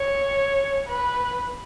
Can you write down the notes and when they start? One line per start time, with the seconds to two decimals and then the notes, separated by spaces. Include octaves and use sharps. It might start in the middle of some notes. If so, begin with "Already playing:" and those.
Already playing: C#5
0.87 B4